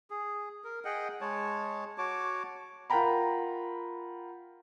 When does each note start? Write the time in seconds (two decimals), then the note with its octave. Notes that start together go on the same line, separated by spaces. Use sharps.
0.10 G#4
0.64 A#4
0.85 G#4 D#5 F#5 G5
1.21 G#3 C#5 A5
1.98 F#4 C#5 A5 D6
2.90 F4 A#4 F#5 G5 A#5 B5